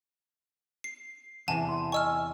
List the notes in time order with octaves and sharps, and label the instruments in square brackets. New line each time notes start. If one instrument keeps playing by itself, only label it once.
[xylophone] C7
[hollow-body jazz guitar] E2 C3 E3 [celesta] F#5 [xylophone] G#5 A5
[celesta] C6
[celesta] D#5 G#5 [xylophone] C#6 E6 F6